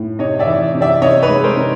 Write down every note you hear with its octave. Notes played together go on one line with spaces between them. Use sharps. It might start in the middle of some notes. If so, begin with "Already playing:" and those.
Already playing: A2
C3 C#5 D#5
D5 E5
E3
C3
D5 E5
C3 C#5 D#5
B4 C#5
G#3
A#4 C5
C3